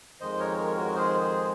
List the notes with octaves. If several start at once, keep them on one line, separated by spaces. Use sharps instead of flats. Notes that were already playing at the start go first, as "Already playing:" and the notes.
F2 D#3 G#3 C5 D#5
A#4 C#5
A#4 C#5
F#4 A#4
G#4 C5
G#4 C5